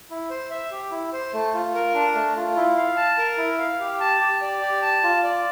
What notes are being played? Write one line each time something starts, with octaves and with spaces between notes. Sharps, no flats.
E4
C5
E5
G4
E4
C5
A3
F4
A#4
D4
A3
F4
E4
F5
A5
A#4
E4
F5
G4
A5
G4
D5
G4
A5
F4
D5